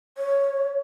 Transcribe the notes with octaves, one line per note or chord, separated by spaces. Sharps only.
C#5